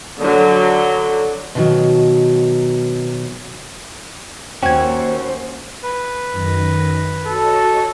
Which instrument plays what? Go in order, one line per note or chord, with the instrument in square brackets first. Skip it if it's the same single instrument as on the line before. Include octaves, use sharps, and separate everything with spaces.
[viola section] D3 F#3
[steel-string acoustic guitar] B2 D#3 F#3
[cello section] D#2 [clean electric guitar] C#4 F#4 [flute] C5 [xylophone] G5 G#6
[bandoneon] B4
[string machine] F#2 D#3 A#6
[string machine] F#4 C#5 D#5 [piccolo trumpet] A4